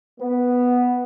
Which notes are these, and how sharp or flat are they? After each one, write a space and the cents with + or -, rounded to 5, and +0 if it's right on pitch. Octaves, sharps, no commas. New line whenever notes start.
B3 +0